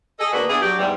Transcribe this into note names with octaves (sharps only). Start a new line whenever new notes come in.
G#4 A4 D#5
D2 A#3 D4 F#4 G#4 B4
B3 D4 E4 G#4
F#3 D4 G4
E2 G#2 E3 G3